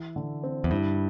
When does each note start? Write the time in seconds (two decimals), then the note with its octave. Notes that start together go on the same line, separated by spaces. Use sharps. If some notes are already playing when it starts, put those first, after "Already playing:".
Already playing: E3 E4
0.16 D3
0.44 C4
0.64 E2
0.71 G2 E4